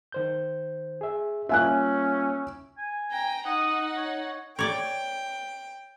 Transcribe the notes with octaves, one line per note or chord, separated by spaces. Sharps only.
D#3 C5 G6
G#4 E5
G3 A#3 C#4 F4 E5 G#5 F#6
G#5
G5 A#5
D#4 F#5 D#6
C#5
C#5 D5 G5